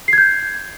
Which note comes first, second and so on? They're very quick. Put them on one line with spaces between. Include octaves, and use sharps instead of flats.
C7 G#6 G6